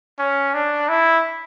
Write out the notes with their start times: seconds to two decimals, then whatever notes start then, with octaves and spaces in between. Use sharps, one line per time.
0.19 C#4
0.54 D4
0.89 E4